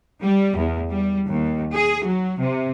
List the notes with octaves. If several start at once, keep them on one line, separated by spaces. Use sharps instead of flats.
G3
E2
G3
D#2
G#4
F#3
C3